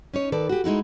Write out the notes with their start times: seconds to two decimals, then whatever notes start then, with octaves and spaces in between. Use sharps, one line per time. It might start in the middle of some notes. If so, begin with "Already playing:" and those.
0.14 C#4 D#4 C#5
0.32 D#3 A4 B4 D5
0.49 F#4 G4
0.64 G#3 D#4 E4 F#4